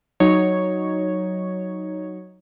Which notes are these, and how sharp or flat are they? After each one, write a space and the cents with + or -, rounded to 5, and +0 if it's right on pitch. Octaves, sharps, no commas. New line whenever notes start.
F#3 +0 D#4 +0 C#5 +0